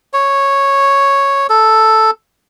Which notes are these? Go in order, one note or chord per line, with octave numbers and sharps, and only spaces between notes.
C#5
A4